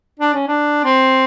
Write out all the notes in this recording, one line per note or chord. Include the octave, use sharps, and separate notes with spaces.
D4
C#4
D4
C4